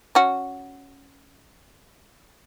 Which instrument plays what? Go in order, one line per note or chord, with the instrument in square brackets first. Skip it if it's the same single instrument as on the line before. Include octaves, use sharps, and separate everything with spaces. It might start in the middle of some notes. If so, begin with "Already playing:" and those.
[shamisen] C#4 F#4